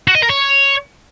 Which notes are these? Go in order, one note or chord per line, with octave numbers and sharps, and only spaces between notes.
F#4
D#5
A#4
C#5